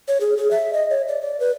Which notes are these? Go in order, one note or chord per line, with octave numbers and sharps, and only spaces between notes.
C#5
G#4
G#4
E5
D#5
C#5
D5
D5
B4